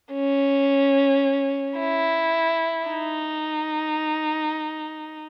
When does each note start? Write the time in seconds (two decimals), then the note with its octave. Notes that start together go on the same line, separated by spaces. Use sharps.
0.13 C#4
1.78 E4
2.89 D#4